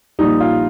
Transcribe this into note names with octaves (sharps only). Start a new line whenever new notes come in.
A#1 A#2 G3 D#4
F4